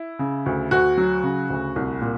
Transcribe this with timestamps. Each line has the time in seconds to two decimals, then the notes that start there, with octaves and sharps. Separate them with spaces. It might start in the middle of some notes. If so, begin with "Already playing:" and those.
Already playing: E4
0.19 C#3
0.46 D2
0.71 D2 F#4
0.97 F#3
1.23 C#3
1.50 D2
1.76 C2
2.01 A#2